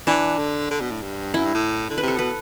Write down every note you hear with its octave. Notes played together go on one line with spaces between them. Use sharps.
E3 D4
D3
D3
B2
A2
G2
F#2 E4
G2
A2
D3
C3 B4
A4
B2 B4